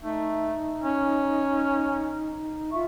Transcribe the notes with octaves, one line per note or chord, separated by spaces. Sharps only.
A3 D#4
C#4
F4 E5 C#6